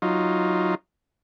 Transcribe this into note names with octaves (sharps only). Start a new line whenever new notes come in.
F#3 D#4 F4